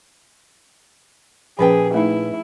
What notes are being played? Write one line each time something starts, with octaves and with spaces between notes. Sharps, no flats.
A#2 F3 C#4 G#4 B4 G5 G#5
A3 D#4 E4